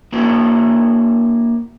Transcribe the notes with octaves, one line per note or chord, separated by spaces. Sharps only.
A#3 D4 E4 F#4 C5